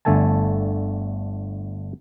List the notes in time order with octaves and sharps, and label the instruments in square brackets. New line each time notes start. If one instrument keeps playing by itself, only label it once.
[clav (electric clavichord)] G1 D3 A3 A4 G#5 A5